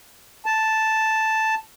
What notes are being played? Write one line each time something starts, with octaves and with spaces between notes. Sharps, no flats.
A5